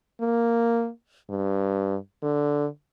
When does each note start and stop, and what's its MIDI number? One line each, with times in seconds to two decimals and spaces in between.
0.21 0.89 58
1.30 1.96 43
2.23 2.66 50